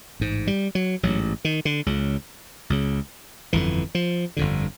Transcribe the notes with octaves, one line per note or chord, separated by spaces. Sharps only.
A1 G#2
G3
F#3
A1 G#2 F#3
D#3
D3
C#2 C#3
C#2 C#3
G1 F2 D3 E3
F3
G1 F2 D3